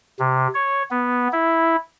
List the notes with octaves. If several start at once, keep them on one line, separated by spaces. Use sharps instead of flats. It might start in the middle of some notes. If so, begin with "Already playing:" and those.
C3
C#5
B3
E4